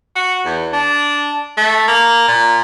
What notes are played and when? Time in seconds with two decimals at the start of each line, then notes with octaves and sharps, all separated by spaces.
0.16 F#4
0.46 E2
0.73 D4
1.57 A3
1.88 A#3
2.28 A#2